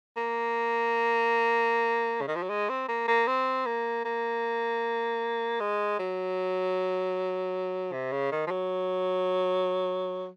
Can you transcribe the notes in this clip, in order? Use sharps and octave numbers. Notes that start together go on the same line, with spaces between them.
A#3
C#3
D#3
F3
F#3
G#3
C4
A#3
A#3
C4
A#3
A#3
G#3
F#3
C3
C#3
D#3
F3
F#3